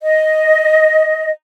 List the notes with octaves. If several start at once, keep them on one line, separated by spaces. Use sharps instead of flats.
D#5